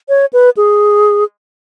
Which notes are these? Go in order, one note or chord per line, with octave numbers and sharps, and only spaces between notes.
C#5
B4
G#4